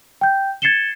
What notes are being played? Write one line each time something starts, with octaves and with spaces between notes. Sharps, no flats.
G5 G6
G#6 A6 C7 C#7 E7 G7